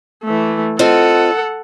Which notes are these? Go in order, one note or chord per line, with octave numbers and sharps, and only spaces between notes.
E3 A3
C4 F4 A4 D#5 F#5